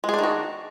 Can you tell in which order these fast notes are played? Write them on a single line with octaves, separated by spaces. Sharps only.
G#3 G#4 D4 D#3 F#4